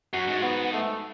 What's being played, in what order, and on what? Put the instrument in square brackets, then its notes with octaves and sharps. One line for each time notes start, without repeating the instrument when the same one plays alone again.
[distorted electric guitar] F#2 [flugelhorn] F#4
[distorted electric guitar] G#2
[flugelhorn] B3
A3